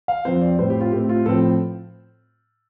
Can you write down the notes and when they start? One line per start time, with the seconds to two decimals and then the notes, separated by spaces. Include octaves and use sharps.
0.08 F5
0.25 F2 F3 C4 C5
0.41 D5
0.58 A2 G3 C4 C5
0.70 G4
0.81 F4
0.92 A2 A3 C4 G4
1.09 F4
1.26 A2 F3 C4 A4